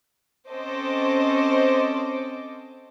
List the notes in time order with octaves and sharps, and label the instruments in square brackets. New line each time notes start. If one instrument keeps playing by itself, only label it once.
[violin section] C4 C#4 A4 C5 D#5 D6